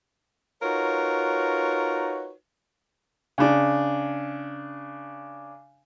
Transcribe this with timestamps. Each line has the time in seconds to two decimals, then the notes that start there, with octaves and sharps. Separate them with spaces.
0.63 D#4 F4 F#4 A#4 B4 C#5
3.38 C#3 D4